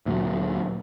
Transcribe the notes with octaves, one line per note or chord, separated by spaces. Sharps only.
D2 A#2 F#3